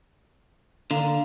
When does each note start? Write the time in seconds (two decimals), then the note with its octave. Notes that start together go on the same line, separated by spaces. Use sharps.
0.91 D3 A#3